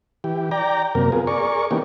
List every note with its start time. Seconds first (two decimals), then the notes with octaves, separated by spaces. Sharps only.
0.24 E3 G4
0.51 D5 G5 A#5
0.95 F#2 C3 A#3 A#4
1.12 B3 F4 G#4
1.27 G#4 A#4 D5 C#6
1.71 E3 A#3 B3 C#4 D#4 G4